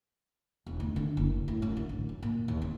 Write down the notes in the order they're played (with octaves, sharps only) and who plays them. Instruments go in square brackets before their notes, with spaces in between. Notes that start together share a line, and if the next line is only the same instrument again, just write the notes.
[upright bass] E1
D2
D3
F#1
A2
F#2
D3
A1
F#2
A#2
D#2
C4